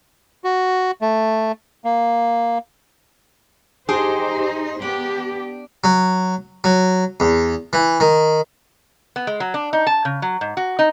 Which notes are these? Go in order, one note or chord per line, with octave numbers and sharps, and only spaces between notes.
F#4
A3
A#3
D#4 G4 G#4 C5
B3 D4 G4
F#3
F#3
E2
E3
D#3
B3
G#3
F#3
D4
D#4
A5
C#3
F#3
G#2
F#4
D#4